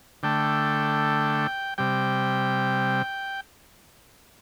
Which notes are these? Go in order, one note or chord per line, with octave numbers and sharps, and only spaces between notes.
D3 A3 G5
C3 G3 G5